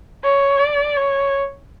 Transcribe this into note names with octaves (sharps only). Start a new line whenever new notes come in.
C#5
D5
C#5